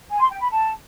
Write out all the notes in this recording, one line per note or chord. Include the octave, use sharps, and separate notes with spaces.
G#5
C6
G5
B5
A5